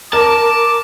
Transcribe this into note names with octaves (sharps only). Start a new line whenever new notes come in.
A#4 A5 D6